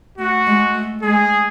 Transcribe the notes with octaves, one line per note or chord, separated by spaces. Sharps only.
A3 F#4
G#3
A3
G#3 G#4